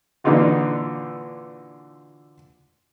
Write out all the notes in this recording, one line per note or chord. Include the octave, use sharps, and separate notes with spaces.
A#2 D3 E3 D#4 F4 F#4